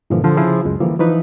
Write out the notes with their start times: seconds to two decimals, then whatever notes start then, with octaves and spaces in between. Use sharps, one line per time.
0.10 G2 A#2 D3 E3 F3
0.24 D3 F3
0.37 C#3 F3 E4 G#4
0.65 C#2 F#2 G#3
0.81 D3 E3 F3 G3 A#3
0.99 E3 F3 D#4 B4